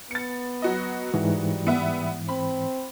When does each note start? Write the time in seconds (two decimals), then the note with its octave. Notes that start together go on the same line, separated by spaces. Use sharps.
0.11 B3 A6 C#7
0.62 F#3 F#4 D#5
1.14 G#2 E3 G3
1.67 B3 E5 F#5
2.29 C4 B5